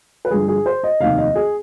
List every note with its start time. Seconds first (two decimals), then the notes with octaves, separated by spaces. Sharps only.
0.25 B4
0.30 G2 D3 F3 G#4
0.48 G#4
0.66 C5
0.83 D#5
1.00 F1 D#2 D#3 F5
1.18 D#5
1.35 G#4